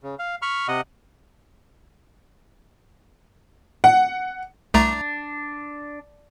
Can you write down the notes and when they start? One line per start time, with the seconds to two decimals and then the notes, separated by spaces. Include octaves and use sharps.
0.03 C#3
0.19 F5
0.42 B5 C#6 F6
0.68 C3 D#5 F#5
3.84 F#5
4.74 C2 A3 D4 A#5